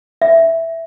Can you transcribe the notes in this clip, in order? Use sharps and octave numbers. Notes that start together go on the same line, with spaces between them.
E5